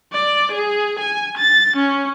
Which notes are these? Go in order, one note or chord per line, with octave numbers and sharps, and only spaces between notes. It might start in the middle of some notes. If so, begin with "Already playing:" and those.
D5
G#4
G#5
A6
C#4